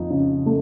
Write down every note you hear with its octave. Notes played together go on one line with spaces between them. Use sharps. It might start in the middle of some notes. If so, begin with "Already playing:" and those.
Already playing: F2 D#4
C#3
A3